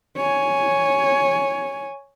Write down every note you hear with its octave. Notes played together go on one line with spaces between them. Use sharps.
C#5 G#5